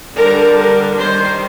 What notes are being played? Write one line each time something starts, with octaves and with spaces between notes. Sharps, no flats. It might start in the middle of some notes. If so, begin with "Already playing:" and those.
D3 G3 D4 A#4
A#4
D#3 G3 D4 C5